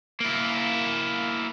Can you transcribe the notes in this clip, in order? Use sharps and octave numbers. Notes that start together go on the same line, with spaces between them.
A#3 E4